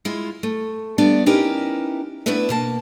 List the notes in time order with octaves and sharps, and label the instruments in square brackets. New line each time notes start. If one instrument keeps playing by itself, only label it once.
[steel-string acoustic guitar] G#3 E4 F4
A3
G3 A3 B3 D4 D5
C#4 D#4 E4 G4 A#4 B4
A3 B3 D4 E4 B4 E5
B2 A#3 A5